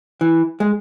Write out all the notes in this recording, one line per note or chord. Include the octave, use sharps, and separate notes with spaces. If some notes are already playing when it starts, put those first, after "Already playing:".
E3
G#3